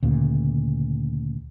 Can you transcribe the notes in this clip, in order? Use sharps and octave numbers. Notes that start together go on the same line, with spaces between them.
D2 A#2 C#3